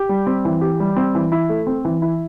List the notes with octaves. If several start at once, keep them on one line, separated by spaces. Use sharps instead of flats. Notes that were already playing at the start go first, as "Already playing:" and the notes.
Already playing: G4
G3
C4
E3
G4
G3
C4
E3
E4
A3
C4
E3
E4